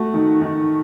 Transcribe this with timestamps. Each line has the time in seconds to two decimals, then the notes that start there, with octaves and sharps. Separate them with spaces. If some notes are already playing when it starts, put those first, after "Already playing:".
Already playing: A3 F#4
0.14 D#3
0.41 D#3